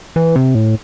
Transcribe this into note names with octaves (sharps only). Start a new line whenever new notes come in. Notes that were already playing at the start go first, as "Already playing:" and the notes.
E3
C3
A2